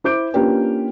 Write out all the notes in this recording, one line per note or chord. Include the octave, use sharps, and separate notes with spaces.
E4 C5 D6 G6 D7
A#3 C#4 D4 F4 G4 B4